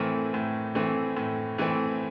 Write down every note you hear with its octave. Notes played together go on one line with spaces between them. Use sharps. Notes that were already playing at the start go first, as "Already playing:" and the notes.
Already playing: A2 E3 A3 C4 A#4
A2
E3 A3 C4
A2
E3 A3 C4